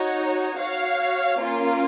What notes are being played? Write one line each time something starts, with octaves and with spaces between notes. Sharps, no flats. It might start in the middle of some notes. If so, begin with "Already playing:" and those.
Already playing: D#4 F#4 C#5
F#4 C#5 F5
A#3 C#4 F4